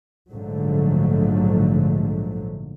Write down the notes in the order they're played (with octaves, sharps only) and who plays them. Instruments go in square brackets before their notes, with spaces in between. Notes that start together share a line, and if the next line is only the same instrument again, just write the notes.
[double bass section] A#1 G#2 D3 F3 F#3 A3